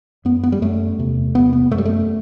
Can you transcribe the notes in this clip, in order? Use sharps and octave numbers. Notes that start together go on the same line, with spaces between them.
F#2 B3
B3
G3
F#2 A3
E2 C3
E2 C3 B3
B3
F#2 A3
G3
A3